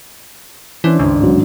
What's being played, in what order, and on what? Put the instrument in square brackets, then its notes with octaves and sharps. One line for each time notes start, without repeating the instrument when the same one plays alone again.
[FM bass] E3 [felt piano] C#4 [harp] D4 E4 C5
[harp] G#1 G2 [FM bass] C#2
[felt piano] A1 G#2 F#3